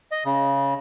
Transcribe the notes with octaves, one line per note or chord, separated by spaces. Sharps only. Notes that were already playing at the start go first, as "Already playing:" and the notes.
D#5
C#3